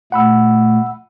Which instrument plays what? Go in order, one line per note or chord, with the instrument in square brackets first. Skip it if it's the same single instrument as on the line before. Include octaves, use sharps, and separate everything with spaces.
[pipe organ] A#2 A3 [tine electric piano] F#5 B5 E6